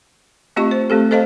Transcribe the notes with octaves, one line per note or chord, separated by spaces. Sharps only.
A3 C4 F4 G4 D#5 C#6
C5
A3 C4 G4 A4
A4 C5 D#5 F5 A5